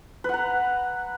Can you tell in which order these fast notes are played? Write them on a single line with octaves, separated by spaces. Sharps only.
B4 F#5 A#5